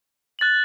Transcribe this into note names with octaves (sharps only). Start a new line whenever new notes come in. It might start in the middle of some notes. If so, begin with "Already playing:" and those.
F#6 A6 F#7